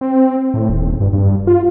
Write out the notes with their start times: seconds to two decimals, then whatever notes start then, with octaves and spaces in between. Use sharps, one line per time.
0.01 C4
0.54 A2
0.70 D#1
1.01 G2
1.13 G2
1.47 F4